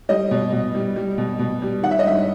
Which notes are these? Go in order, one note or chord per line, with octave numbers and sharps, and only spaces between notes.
G3 D#5
B2
B2
G3
G3
B2
B2
G3
D#3 F#5
E5
D#5
G2 E5